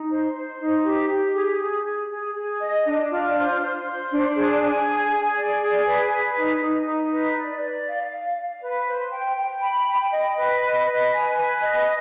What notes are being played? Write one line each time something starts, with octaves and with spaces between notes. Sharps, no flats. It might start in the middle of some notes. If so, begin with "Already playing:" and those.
Already playing: D#4
C5
C5
D#4
G4
G4
G#4
G#4
G#4
G#4
G#4
D#5
D4
F4
C5
C5
C5
D4
G#4
G#5
G#4
G#4
D5
G#4
B4
B4
D#4
D#4
D#4
B4
D5
D5
F5
F5
F5
B4
C5
G5
G5
B5
G5
D#5
B4
D#5
B4
G#5
B4
D#5